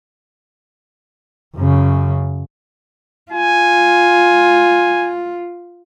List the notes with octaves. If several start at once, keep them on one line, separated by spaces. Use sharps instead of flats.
F#2 C#3
F4 G#5